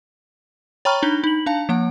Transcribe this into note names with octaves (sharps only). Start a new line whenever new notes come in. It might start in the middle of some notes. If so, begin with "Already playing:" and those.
C#5 G5 A#5 B5 C#6 F6
D4 D#4 G7
D#4 F#7
D4 F5 A5
F3 A#3 F#5